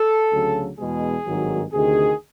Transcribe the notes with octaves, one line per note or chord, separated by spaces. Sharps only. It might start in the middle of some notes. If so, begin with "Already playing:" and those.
Already playing: A4
D2 C#3 F#3
E2 B2 G#3 G#4
G#1 G2 D#3 F#3
D2 C3 D#3 G#4